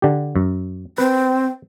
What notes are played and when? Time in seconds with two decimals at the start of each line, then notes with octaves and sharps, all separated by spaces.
0.02 D3 G4
0.36 F#2
0.98 C4 B4